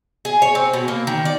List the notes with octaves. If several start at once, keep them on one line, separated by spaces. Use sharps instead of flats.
G#4
C#5
C4
B2
A#3
D#3
D5